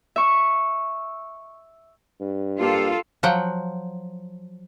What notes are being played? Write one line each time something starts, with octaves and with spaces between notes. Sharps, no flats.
E5 C#6
G2
A#3 F4 G4 A4
F3 F#3 F#5 G5